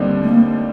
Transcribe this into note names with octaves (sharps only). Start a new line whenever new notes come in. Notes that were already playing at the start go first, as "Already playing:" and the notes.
Already playing: D#2 D3 G3 C4 D#4
A3
A#3